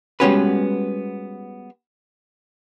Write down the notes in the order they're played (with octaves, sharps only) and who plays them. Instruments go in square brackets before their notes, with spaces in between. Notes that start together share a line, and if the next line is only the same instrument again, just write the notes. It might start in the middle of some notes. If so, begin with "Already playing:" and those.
[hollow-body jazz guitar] G3 G#3 B3 C#4 F#4 B4